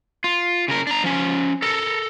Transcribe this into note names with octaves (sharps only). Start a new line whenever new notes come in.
F4
C#3 A#4
D4 A#5
F3 C#4
A4 A#4